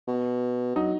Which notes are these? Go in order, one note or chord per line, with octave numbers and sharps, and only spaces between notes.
B2
F#3 D#4